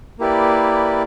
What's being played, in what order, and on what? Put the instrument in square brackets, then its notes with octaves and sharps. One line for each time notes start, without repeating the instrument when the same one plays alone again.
[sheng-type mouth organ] A#3 E4 G4 B4 D5